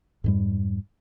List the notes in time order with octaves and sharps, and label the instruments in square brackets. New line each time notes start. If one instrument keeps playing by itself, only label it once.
[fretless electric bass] F2 G#2 G3